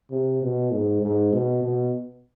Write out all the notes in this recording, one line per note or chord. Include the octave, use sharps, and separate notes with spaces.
C3
B2
G#2
G#2
B2
B2